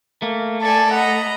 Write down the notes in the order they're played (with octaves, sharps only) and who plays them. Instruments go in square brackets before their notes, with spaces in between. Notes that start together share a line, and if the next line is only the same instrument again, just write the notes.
[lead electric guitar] A3 [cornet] A#3
[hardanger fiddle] A4 [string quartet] D5 G#5 [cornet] A5
[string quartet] D#5 A#5 B5 [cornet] F#5